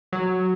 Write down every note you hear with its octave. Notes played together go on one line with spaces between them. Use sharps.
F#3